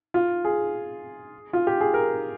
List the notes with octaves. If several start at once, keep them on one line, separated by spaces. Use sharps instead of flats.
F4
G#4
F4
G4
G#4
A#4